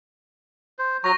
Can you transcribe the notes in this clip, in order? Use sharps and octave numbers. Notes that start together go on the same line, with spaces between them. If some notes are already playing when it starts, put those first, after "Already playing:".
C5
F#3 A#5 C#6 A#6